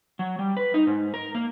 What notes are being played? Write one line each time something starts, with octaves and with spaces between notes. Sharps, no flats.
F#3
G3
B4
D#4
G#2
A#4
A#3